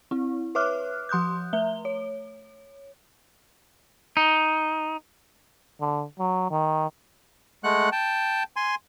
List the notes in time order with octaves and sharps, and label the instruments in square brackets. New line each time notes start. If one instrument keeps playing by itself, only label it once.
[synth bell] C4 E4
B4 C#5 E5 D6 F6 F#6
F3 C6 D#6 F#6 G6
A3 E5 G7
C#5
[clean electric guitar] D#4
[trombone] D3
F#3
D#3
[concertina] G#3 A3 F#5 F#6
G5 A5
G#5 C6